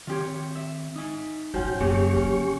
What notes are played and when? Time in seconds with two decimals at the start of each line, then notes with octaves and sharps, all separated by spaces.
0.07 D#3 C4 F4 G4 C#5
0.55 E5
0.96 D#4 G#5
1.54 G#2 F3 F#3 C#4 F#4 G5
1.81 F#2 C#3 F#3 A#3 G4 C#6
2.16 D3 C#4